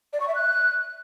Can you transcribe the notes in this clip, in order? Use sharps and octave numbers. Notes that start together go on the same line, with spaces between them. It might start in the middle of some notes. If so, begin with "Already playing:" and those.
D5
C#6
E5
F#6